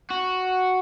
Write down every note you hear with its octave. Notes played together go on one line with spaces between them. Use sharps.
F#4